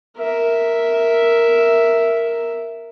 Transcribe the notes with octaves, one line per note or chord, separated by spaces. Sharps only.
A#4 E5